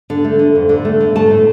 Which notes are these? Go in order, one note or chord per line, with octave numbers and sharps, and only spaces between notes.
D3
A3
D3
F2
D3
A3
D3
A3 A5
A2